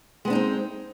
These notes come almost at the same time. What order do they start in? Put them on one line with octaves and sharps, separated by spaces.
G#3 B3 D4 D#4 C4